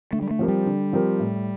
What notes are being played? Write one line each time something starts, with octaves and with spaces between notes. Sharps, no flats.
D3 A3
G3
A3
F3 C4 G4 A#4
G3
D3
F3 C4 G4 A#4
A2